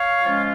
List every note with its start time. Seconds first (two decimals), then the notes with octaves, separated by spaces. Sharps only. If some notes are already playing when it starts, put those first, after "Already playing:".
Already playing: C#5 F5
0.24 F3 G#3 C#4 F4